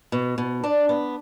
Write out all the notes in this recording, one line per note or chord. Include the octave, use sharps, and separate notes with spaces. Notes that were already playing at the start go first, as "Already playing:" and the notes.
B2
B2
D4
B3